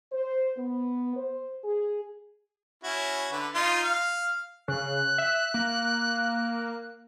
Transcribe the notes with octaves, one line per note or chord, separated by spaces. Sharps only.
C5
B3
C5
G#4
C#4 E4 F#4
D3 B4
D#4 F4 C6
F5
C#3 F#6
E5
A#3